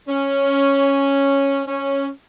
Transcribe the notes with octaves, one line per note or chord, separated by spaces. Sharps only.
C#4
C#4